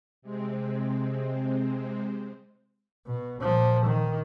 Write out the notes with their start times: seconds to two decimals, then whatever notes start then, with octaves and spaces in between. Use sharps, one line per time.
0.22 C3 G#3 C4
3.07 B2
3.42 A#2 F3
3.86 D#3